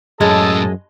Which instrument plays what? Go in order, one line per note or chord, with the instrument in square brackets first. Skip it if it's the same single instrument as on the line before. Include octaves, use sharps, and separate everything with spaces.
[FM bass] F#2 [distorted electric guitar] A2 C#4 [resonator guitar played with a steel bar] G#3 [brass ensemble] A4 D#5 A5